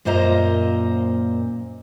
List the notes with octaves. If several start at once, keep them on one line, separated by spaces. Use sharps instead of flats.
F#2 A#2 A#3 C5 D#5 A#5